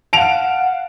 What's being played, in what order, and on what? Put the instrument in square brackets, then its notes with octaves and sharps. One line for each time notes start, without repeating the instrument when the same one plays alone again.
[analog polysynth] F5 F#5 [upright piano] A5 D7 F7